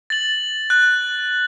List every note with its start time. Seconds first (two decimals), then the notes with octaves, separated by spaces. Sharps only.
0.10 A6 F#7
0.70 F#6